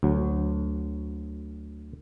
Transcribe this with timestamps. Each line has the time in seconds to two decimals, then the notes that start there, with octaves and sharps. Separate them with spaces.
0.03 D2 F#3